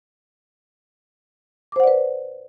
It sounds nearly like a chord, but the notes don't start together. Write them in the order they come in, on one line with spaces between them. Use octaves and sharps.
D6 C5 F#5 D5 B4